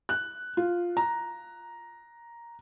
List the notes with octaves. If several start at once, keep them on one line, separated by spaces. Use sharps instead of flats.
F#6
F4
A#5